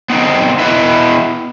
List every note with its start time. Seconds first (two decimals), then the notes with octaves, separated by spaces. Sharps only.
0.10 B3 C4 D#4
0.59 B3 E4 B4 D#5 E5